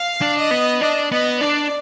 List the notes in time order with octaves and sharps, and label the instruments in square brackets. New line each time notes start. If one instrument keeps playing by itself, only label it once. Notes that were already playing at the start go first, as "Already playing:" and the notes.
Already playing: [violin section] F5
[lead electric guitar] D4
[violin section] D#5
[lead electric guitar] B3
[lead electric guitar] D4 [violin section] D#5
[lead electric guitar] B3 [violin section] D#5
[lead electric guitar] D4 [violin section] D5